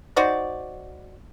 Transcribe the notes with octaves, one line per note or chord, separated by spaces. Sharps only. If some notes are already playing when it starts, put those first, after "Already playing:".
D#4 F#4 C5 D5